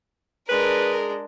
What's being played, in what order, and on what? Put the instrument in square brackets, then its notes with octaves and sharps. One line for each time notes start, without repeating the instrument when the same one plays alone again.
[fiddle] G#3 D4 [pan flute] G#4 [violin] A#4 [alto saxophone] B4